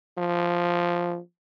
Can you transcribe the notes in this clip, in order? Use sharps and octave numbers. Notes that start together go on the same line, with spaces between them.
F3